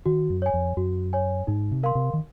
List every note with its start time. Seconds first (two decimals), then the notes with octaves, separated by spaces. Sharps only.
0.06 D#3 F#4
0.30 F#2
0.42 C#5 G#5
0.54 F2
0.77 F#2 F#4
1.13 C#5 G#5
1.47 G#2 D#4
1.71 C3
1.83 A#4 F5 C6
1.95 C3
2.13 D#3